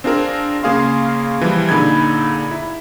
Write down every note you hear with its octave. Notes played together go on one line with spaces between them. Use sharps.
C4 D4 F4 G#4 A#4
C#3 A#3 G#4 F5 C6
E3 F3 G3
A#2 D3 D#4 G#4 B5 G#6
E4